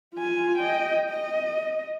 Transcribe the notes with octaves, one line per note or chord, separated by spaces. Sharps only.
F4 G#5
D#5 G5
D#5